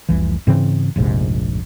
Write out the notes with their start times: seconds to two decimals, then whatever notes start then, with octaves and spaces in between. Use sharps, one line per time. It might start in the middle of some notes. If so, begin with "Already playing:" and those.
0.09 F1 C2 E3
0.47 G#2 C#3 E3 C4
0.96 F1 A#1 G#2 C3